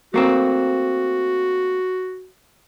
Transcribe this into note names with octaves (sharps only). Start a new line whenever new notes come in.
A3 A#3 C4 F#4